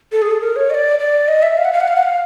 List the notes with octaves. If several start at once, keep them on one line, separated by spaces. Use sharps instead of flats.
A4
G#4
A4
A#4
C#5
D#5
D5
D5
D#5
E5
F5
F#5
F5
F#5
F5
F#5
F5